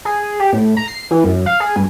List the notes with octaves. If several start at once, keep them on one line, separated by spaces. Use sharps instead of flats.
G#4
G4
A2
A#5
C7
E3
F#2
F5
G#4
G2